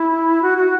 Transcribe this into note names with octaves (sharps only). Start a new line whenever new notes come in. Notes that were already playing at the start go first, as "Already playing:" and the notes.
Already playing: E4
F#4
F#4